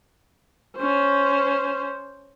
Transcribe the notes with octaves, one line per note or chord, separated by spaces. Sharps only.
C#4 C5